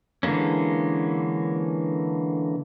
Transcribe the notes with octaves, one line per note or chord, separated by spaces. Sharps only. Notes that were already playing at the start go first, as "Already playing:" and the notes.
D3 E3 G#3 A#3 C#4